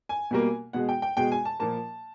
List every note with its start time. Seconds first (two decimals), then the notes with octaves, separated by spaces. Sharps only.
0.09 G#5
0.31 B2 G3 A#3
0.73 B2 G#3 F#5
0.89 G5
1.02 G5
1.17 B2 G#3 G5
1.32 G#5
1.45 A5
1.60 A#2 F3 A#3 A5